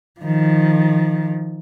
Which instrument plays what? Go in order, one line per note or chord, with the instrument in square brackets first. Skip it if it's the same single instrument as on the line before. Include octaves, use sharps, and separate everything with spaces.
[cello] D#3 F3